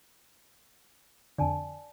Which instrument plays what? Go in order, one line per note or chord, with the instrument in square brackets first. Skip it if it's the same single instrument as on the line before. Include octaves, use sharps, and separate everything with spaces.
[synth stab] F2 D3 [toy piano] D5 G#5 A5